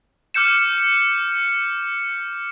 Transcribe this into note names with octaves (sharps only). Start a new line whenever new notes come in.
D6 F6 G6 C#7 E7